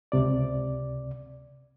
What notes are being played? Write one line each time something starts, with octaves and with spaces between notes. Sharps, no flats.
C#2 C3 D5